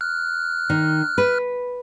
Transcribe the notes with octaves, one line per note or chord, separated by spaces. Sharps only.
F6 F#6
D#3
B4